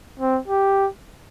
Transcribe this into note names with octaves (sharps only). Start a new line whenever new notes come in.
C4
G4